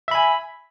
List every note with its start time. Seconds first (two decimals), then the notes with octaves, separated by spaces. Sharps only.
0.08 E5
0.11 B5
0.15 G#5